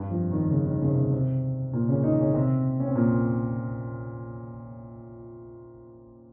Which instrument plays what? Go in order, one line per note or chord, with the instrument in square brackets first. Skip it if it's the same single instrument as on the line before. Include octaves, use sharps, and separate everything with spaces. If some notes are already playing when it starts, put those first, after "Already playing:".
Already playing: [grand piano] G2 G3
F2 F3
D#2 D#3
C#3
D#2 D#3
C#3
C3
C#3
C3
A#2 A#3
C#3 C#4
D#3 D#4
C#3 C#4
C3 C4
C#4
C4
A#2 A#3